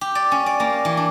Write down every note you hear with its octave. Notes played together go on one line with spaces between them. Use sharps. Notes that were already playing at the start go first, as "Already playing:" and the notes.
G4
D5
C#4
D5
A#3
E3
D4